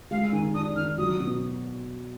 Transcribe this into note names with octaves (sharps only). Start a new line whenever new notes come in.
G#3 F5
D#3 G#5
D4 D#6
D#3 F6
F#3 D#6
B2